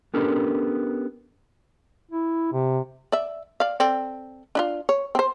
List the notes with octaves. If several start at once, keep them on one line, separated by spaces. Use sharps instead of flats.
B3 C#4 D4 G4 A4 A#4
E4
C3
D5 E5
D5 F5
C4 A4 D5
D4 E4 F4
C#5
C4 C5